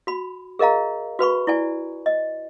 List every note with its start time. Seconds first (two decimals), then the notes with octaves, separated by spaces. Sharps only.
0.07 F#4 B5
0.59 G#4 A#4 D#5 F5 A#5
1.19 F#4 B4 B5 C#6
1.47 E4 D5 G#5
2.06 D#5